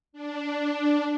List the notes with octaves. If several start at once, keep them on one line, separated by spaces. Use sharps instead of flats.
D4